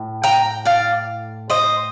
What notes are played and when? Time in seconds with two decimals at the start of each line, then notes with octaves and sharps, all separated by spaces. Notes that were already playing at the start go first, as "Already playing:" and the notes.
Already playing: A2
0.24 G5 A#5
0.65 D5 F5
1.50 C5 D#5